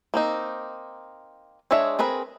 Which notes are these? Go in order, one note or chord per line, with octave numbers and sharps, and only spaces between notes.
A#3 C4 D#4
G#3 D4 G#4 C#5 E5
C4 G#4 A#4 B4